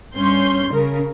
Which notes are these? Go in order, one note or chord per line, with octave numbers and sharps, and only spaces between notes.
G2 C#4 C6 G6
C#3 A#4